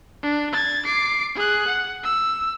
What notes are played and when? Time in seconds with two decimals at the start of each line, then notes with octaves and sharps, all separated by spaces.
0.23 D4
0.53 G#6 A6
0.85 D6 C7
1.35 G#4 F#6
1.67 F#5
2.03 E6